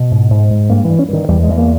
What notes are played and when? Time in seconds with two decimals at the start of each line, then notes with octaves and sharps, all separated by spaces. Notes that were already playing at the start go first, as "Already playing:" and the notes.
Already playing: B2 B3
0.11 G#2
0.30 G#2
0.50 G#2
0.69 G2 A#3
0.85 G2 E3
0.99 C#4
1.09 G2 D#3
1.28 E2 G3
1.43 G#3
1.48 E2
1.57 A#3